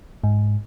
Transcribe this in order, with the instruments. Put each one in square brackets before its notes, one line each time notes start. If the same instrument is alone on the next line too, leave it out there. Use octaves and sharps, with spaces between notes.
[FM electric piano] G#2